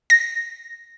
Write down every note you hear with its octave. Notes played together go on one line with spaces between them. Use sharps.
A#6